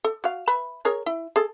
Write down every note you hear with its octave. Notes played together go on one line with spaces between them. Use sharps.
A4
F#4 F5
B4 E5 B5
G#4 A#4 C#5
E4
G#4 A4